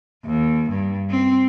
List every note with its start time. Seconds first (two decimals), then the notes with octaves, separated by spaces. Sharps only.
0.24 D#2
0.69 G2
1.10 C4